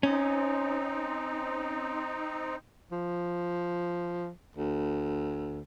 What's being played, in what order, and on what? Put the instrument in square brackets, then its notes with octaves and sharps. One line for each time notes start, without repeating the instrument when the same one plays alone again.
[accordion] C4 D#4 [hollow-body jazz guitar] C#4
[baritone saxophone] F3
D2